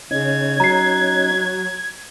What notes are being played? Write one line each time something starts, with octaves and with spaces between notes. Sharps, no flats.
C#3 C#4 D#4 G#6
F#3 A#5 C7